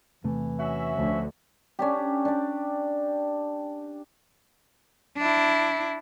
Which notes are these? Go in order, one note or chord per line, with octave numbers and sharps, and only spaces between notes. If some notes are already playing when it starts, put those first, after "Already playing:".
E2 C3 E3 A3
C#4 F#4 E5
D2 D3 F3
C#4 D4 G4
D4 D5
D4 E4